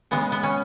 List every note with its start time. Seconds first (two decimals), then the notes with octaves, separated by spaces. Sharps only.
0.11 C#3 G#3 B3
0.32 B3
0.43 C#4